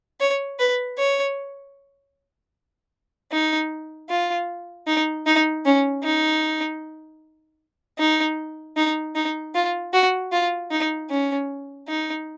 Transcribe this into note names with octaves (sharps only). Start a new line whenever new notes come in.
C#5
B4
C#5
D#4
F4
D#4
D#4
C#4
D#4
D#4
D#4
D#4
F4
F#4
F4
D#4
C#4
D#4